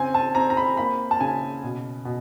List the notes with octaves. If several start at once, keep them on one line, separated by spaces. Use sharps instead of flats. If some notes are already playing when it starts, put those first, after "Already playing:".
Already playing: C#3 C4 G#5
A5
C4 A#5
A#5
B5
A#3 B5
A5
C#3 G#5
B2
B2